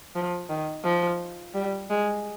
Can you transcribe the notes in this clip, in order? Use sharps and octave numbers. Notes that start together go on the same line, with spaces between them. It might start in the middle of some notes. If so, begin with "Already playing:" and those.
F3
D#3
F3
G3
G#3